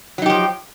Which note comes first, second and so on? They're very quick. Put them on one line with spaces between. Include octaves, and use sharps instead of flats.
F#3 D#4 G4 F3